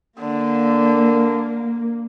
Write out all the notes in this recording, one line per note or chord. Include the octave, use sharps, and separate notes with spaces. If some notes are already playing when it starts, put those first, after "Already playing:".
D3 A#3